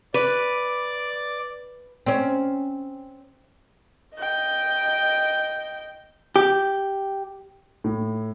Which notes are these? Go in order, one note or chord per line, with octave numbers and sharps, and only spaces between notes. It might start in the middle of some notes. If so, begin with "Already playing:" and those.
B4 D5
C4 C#4
D#5 G5
G4
A2